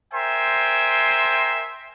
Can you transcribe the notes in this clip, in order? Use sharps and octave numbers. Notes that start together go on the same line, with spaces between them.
A#4 C5 E5 G5 G#5 C6